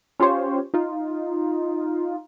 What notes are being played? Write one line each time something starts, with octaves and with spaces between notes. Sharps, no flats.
C#4 F4 G4 C5 C#5
D#4 F4